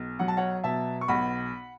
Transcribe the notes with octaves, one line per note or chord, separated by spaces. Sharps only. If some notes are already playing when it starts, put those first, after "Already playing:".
Already playing: B1
F#3 F#5
A5
C#5 F#5
B2 E5 A5
C#6
B1 F#5 B5